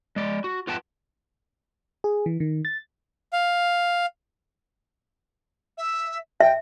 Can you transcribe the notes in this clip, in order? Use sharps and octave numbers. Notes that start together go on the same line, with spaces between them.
G#3 D5
F#4
F4 B4 F#5 G5 A5
G#4
E3
D#3
A6
F5
E5
E5 G5